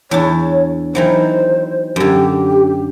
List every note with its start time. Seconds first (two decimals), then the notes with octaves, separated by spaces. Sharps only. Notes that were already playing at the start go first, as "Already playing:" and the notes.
0.11 E2 D4 C#5
0.95 D#3 E3 F#3 C5
1.96 F#2 D3 G4